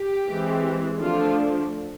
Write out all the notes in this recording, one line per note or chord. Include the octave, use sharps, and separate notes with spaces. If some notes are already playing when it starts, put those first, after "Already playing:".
Already playing: G4
E3 G#3 C4
D3 F3 A3 D4 F4